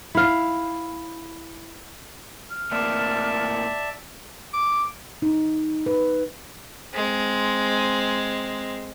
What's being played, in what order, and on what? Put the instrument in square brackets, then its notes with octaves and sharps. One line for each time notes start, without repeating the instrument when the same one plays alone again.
[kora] E4 F5
[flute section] F6
[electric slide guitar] A2 A#3 C4 [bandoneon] D5 E5 A5
[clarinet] D6
[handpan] D#4
B4
[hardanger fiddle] G#3 C4